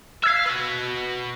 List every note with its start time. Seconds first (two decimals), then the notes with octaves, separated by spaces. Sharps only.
0.24 E5 F5 E6 G#6 B6
0.46 F#4 B4